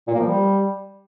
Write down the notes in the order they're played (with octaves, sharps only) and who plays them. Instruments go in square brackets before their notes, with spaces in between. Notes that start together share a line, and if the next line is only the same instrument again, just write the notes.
[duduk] A#2
A#3
F3
G3